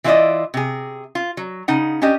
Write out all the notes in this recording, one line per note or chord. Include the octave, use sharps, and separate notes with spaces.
E3 E4 F4 A4 D5 D#5
C3 G#4
F4
F#3
C#3 D#4 F#5
C#4 D4 G4 D#5